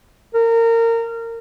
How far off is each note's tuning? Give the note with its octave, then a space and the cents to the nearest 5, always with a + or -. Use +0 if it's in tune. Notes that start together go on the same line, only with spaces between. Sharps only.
A#4 -25